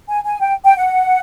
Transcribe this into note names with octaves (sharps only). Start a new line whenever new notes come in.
G#5
G#5
G5
G5
F#5